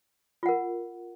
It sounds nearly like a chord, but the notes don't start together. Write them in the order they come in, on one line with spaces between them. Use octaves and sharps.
F4 F#5 A#4